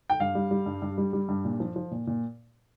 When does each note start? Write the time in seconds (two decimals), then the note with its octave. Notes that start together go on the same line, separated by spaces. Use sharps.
0.10 G5
0.20 G2 F5
0.35 G3
0.51 G3
0.66 G2
0.82 G2
0.98 G3
1.13 G3
1.29 G2
1.45 A#2
1.60 F3
1.76 F3
1.91 A#2
2.07 A#2